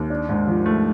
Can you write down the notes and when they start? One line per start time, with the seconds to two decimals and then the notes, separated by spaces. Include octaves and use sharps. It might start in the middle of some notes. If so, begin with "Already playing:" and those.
Already playing: D#2
0.10 D4
0.29 G#2
0.47 F3
0.66 A3